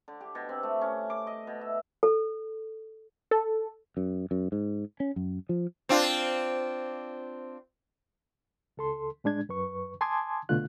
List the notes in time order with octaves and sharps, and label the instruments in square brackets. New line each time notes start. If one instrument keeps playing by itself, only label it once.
[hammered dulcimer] D3
G4
B2
C4
A3
C#4
D6
D#5
B2
E5
[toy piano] A4
[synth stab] A4
[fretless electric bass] F#2
F#2
G#2
C#4
F#2
F3
[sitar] C4 D4 F4
[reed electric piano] C#2 A4 C6
A2 G#3 D4 G#6
F#2 B4 C#6
G#5 A5 C6 D6 D#6 G#6
C2 B2 D3 A3 F4 F#6